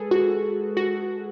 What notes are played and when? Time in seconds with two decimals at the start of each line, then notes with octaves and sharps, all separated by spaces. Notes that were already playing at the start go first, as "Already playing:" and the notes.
Already playing: G#3 G#4 A4 B4
0.11 F#4
0.77 F#4